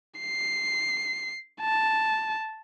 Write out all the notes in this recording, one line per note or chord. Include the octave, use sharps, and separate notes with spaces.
C7
A5